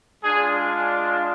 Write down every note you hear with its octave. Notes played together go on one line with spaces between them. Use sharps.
G#3 D4 F4 G#4